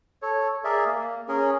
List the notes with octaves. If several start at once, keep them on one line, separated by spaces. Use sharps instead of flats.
A4 C#5
G#4 A#4 D5 E5
A#3
C#4 G#4 A#4